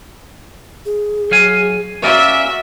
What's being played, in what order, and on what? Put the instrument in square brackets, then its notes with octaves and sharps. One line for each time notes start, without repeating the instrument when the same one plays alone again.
[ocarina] G#4
[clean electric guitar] F#3 F5 G#5
[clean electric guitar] C#4 A#4 D5 [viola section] F#4 E5 [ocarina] F5